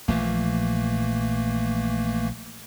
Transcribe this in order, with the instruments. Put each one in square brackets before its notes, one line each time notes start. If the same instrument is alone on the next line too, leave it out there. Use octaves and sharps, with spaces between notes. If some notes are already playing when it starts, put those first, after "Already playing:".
[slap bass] A#1 A#2 F3 [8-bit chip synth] E3 A3 A#3